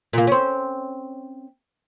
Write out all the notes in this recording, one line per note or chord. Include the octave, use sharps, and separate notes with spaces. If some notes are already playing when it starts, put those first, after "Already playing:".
A#2 A#3
C4 C#4